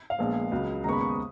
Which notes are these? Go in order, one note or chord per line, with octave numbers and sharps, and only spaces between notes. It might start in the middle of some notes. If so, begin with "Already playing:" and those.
F5
A#1 A#2 G#3 B3
C#2 C#3 F#3
D#2 C#3 G#3 B3 A#5 C#6
B5
C#6
D#6